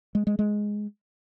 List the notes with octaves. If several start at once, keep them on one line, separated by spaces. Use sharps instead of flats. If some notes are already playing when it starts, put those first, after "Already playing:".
G#3
G#3
G#3